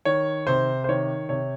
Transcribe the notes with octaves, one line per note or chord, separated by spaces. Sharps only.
D#3 C#5
C3 C5
C5
D#3 C#5
C3 C#5